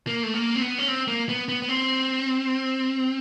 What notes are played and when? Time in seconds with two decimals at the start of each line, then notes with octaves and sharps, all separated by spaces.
0.07 A#3
0.23 A3
0.34 A#3
0.56 C4
0.61 B3
0.78 C#4
0.88 C4
1.08 A#3
1.29 B3
1.49 B3
1.62 B3
1.69 C4